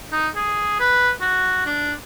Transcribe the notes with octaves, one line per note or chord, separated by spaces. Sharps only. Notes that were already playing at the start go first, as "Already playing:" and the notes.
D#4
G#4
B4
F#4
D4